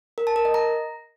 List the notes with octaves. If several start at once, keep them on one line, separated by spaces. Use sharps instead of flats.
A#4
A5
A#4
D#5
A#5